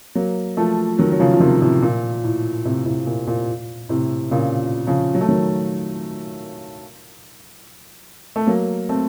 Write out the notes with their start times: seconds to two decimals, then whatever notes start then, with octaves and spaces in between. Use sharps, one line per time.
0.15 F#3 A#3
0.57 F3 A3
0.98 D#3 F#3
1.12 F#3
1.20 C#3 F3
1.33 F3
1.40 C3 D#3
1.61 A2 C3
1.82 A#2
2.24 A2
2.65 A2 C3
2.86 A2 C3
3.06 A#2
3.27 A#2
3.89 A2 C3
4.31 A#2 C#3
4.87 C#3 F3
5.15 F#3
5.21 A3
5.29 D#3 F#3
8.36 A3
8.47 F#3 A#3
8.89 A3 C4